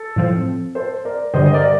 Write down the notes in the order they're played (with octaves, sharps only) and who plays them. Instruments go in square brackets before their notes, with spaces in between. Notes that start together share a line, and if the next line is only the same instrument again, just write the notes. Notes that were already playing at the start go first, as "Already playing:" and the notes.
Already playing: [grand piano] A4
[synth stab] A2 F3 C4
[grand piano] A4 C5
A#4 D5
[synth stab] G2 D3 G3 [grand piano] C5 D#5
[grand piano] D#5
A#4 D5
D5